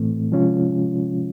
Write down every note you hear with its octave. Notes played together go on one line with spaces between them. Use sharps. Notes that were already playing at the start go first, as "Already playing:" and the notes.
Already playing: A2 E3 A3 C4
C3 F3 G#3 C#4 F4